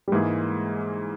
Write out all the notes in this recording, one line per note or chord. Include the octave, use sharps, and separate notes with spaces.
G3
G#2 E3 G#3 A#3 E4 G#4